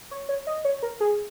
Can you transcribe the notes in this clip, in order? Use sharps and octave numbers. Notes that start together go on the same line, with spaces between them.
C#5
C#5
D#5
C#5
A#4
G#4